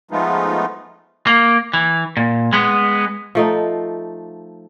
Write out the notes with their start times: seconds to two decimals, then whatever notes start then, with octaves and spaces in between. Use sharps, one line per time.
0.11 F3 G#3 A3 B3 D#4 F4
1.27 A#3
1.73 E3
2.17 A#2
2.53 G#3 B3
3.35 F3 A3 D#4